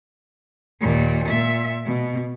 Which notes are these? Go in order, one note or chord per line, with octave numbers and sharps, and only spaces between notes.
D#2 A#2
A#2 E5
B2